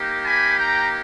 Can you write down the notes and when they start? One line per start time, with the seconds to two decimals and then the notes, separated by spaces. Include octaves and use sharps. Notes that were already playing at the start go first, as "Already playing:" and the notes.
Already playing: A#3 D#4 G4
0.25 G#5 B5
0.58 G5 A#5